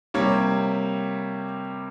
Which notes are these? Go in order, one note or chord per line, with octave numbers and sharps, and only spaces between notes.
C3 G3 A#3 C#5